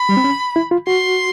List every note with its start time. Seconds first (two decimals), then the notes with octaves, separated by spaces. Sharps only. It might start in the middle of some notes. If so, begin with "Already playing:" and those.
Already playing: B5
0.09 G3
0.17 C4
0.24 C#4
0.56 E4
0.71 F4
0.87 F#4 C6